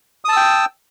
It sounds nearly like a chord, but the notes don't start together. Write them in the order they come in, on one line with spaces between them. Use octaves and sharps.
D#6 A5 E6 G5